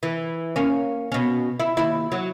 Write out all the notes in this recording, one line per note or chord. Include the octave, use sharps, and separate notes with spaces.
E3
A#3 C#4
B2 C#4
E4
D#2 E4
F#3